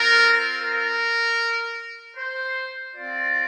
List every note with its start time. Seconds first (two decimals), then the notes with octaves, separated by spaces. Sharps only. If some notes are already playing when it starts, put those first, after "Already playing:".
Already playing: C4 F4 A#4
0.61 A#4
2.17 C5
2.94 C4 F4 D5